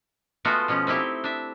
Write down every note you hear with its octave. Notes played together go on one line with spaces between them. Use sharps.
G#3 A3 B3 F4 F#4
B2 F3 C#4
C4 D#4 E4 G4
D4 E5